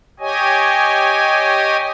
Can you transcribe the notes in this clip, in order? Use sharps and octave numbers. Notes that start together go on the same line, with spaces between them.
G4 C#5 D#5 G#5